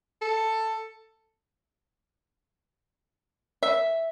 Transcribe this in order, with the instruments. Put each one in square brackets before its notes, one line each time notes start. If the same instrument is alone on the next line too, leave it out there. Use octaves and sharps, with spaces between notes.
[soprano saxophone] A4
[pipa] E5